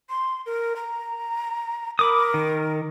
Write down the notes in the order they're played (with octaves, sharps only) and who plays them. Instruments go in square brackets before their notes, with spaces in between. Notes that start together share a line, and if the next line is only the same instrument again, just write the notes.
[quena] C6
A#4
A#5
[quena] A#4 [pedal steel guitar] B5 D6 D#6
[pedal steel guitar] D#3